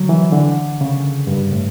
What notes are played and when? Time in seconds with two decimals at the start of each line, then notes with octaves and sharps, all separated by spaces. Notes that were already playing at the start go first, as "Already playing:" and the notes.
Already playing: D3 F#3
0.09 E3
0.32 D3
0.81 C#3
1.27 G2
1.52 A2